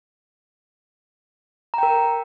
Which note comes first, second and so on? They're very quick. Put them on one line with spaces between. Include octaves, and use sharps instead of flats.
A#5 G5 A#4